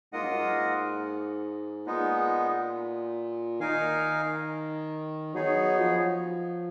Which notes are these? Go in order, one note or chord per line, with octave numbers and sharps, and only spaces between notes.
G#2 A#3 F4 A#4 D#5 F#5
F#2
G#2
A#2 G#3 B3 D#4
D#3 D#4 A#4 F5 G#5
F#3 B3 D#4 G#4 C#5
F3